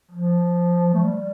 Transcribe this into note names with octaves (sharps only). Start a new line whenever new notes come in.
F3
A3
G3